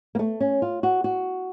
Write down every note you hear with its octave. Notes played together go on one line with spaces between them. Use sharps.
A#3
A3
C#4
F4
F#4
F#4